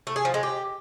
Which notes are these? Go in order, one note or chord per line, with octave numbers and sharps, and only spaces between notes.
A3
G#4
F3
G#3
G4